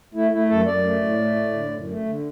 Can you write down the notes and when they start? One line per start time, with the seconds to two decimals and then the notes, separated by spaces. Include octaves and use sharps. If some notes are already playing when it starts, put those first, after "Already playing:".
0.14 A3 E4
0.31 A3 E4
0.49 F#2 A4
0.66 F#2 D5
0.84 A3
1.01 A2
1.19 A3
1.36 A2
1.53 D3
1.71 F#2
1.88 A3
2.05 D3